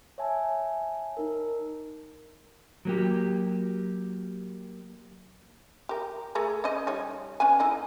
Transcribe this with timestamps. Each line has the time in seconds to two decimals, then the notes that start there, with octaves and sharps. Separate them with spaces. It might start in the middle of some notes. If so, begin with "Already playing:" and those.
0.18 C#5 E5 G#5 A5
1.17 D#4 A#4
2.85 F#3 A#3 G4
5.89 G4 A#4
6.35 A3 G#4 A#4
6.64 C#4 C5 D#5
6.87 G3 D#4 C#5
7.40 C#4 B4 G#5
7.59 A#3 D#4 E4